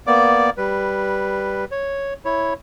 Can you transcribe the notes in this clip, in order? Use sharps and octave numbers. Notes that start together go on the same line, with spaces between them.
A#3 B3 D5 D6
G3 B4
C#5
E4 C#5